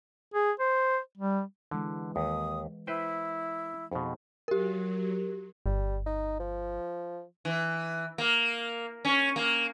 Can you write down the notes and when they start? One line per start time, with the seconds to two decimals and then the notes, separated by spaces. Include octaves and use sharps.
0.34 G#4
0.60 C5
1.18 G3
1.71 D3 E3 G#3
2.16 D#2 D#6
2.87 E4 B4 C5 G5
3.92 F2 B2 D#4 G#4 C5
4.48 F#3 G4 A#4
5.66 G1 G3
6.06 D#4
6.39 F3
7.45 E3
8.18 A#3
9.05 C#4
9.36 A#3